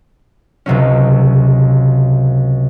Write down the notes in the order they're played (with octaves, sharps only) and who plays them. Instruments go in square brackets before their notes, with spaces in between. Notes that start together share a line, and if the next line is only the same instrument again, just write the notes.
[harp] C#2 C3 F#3 C#4